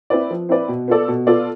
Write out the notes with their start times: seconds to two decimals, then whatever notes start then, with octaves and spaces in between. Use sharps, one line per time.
0.10 C4 E4 B4 D5
0.31 F3
0.49 C4 E4 B4 D5
0.68 B2
0.88 B3 F4 A4 D5
1.08 B2
1.27 B3 F4 A4 D5